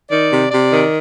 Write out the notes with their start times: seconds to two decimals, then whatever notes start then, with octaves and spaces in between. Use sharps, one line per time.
0.11 D#3 D5
0.30 C3
0.51 C3 D5
0.71 D#3